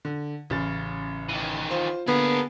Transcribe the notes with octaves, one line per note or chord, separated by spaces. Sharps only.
D3
A1 C#3 A6
D#3 E3
F4 C5
D3 A#3 B3 G#4 A#4